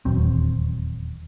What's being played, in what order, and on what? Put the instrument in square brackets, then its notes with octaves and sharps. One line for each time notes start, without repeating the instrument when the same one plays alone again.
[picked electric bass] D#1 E2 F#3 C4